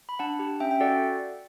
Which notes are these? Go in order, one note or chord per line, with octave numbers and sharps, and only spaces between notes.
B5
D4 F#5 A5
G4
C#4 E5 G5
E5 G5
F#4 A4 D5 F#5